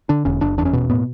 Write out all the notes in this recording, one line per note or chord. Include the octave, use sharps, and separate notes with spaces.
D3 D4
E1 C#4
F#1 D4
E2 D4
C#4
B2
A2 B3